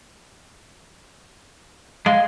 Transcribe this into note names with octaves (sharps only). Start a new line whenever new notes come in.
G#3 F5